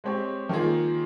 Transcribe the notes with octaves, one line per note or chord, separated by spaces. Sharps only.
G#3 C4 G4 C#5
D#3 A#3 F4 G#4